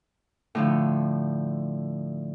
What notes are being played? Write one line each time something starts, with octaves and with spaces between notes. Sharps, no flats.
A2 D3 F3